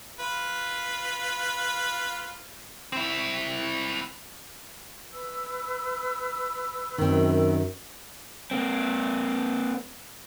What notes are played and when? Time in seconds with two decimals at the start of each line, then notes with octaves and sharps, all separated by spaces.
0.20 F4 B4
2.92 C4 E4
5.12 B4 E6
6.98 F#2 D#3 C4
8.51 A#3 C4